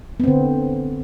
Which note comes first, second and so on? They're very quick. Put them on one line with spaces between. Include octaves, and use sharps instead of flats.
B3 C4 D3